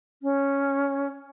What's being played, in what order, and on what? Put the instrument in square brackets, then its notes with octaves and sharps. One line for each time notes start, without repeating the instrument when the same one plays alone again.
[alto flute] C#4